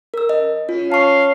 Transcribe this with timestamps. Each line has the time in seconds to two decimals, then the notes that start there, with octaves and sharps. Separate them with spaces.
0.14 A#4 E6
0.29 F#2 D#5
0.69 C#3 C#4 F4
0.92 F5 A5 C#6